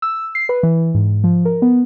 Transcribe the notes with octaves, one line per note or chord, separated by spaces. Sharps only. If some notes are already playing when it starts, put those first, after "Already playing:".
E6
C7
B4
E3
G#2
F3
A#4
B3